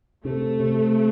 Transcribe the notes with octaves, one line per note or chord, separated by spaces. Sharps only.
C3 A3
C3